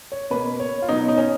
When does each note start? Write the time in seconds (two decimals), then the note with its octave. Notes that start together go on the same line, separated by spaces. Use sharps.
0.12 C#5
0.30 B2 A#3 B4
0.60 C#5
0.82 F4
0.89 B2 F#3 B3 D#4
1.08 D#4
1.18 C#4